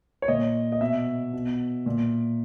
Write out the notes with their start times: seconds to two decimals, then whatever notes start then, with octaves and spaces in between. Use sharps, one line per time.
0.22 C#5
0.28 A#2 D#5
0.72 D#5
0.81 B2 E5
1.33 B2
1.86 A#2